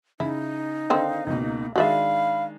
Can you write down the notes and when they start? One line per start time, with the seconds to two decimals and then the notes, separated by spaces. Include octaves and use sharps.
0.20 C#3 D#4 E4
0.90 D3 D#3 C4 F5
1.27 C#2 B2 A#3
1.76 D#3 G#3 D4 F#4 D5 E5 F5 B5